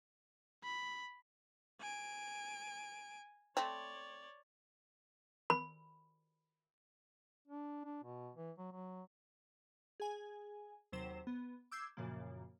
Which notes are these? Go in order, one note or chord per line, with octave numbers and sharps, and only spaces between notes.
B5
G#5 D7
A3 C4 C#5 D5
B5
D4
D4
B2
E3
F#3
F#3
G#4 G#5
D#2 C3 F#3 C5 E7
B3
D6 E6 G6 G#6 C7
F#2 A#2 C#3 F3 A#3